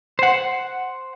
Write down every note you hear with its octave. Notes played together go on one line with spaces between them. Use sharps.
C5 F#5